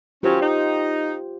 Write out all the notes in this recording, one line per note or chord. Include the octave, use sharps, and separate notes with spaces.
D#3 F#3 C#4 F4 G4 C5
D#4